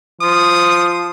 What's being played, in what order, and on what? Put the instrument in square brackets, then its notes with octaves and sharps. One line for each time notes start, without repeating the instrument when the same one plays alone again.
[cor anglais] F3 [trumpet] D#6